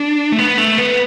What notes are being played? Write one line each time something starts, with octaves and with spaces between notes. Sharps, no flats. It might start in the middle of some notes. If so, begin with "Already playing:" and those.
Already playing: D4
A3
B3
A3
B3